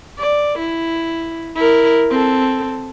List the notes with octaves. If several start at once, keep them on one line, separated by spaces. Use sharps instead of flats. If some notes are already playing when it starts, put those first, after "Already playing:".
D5
E4
E4 A#4
C4 A4